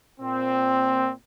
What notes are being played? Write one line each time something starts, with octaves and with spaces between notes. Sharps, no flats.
A#2 C4